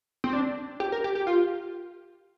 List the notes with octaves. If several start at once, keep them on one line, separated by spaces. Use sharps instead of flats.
C4
D4
G4
A#4
G4
G4
F4